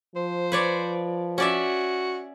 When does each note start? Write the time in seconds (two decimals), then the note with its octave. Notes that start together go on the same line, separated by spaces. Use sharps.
0.16 F3 C5
0.52 B4 C#5 D5
1.38 C#4 F#4 D5 E5